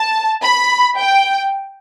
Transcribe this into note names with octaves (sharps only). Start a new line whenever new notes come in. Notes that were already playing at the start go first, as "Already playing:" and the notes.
Already playing: A5
B5
G5